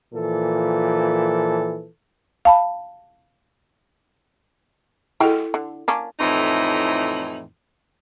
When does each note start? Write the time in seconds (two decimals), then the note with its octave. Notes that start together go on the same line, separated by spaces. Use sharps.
0.13 A#2 E3 F3 A4
2.45 F5 A5 B5
5.20 G#3 E4 F#4 A4 G5
5.54 D3
5.88 A#3 C#4 D4
6.20 F2 A2 E3 D#4